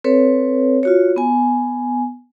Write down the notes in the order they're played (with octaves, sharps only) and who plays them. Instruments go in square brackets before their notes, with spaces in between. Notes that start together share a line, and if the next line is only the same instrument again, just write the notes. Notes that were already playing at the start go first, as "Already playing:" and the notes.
[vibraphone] C4 A4 B4 C#5
F4 F#4 C#5
B3 G#5